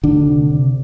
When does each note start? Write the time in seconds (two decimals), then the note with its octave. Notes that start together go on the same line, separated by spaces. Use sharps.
0.04 D2 D3 D4
0.27 C3
0.50 C3